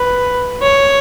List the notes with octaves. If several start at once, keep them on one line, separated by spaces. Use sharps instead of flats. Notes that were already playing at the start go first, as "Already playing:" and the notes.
Already playing: B4
C#5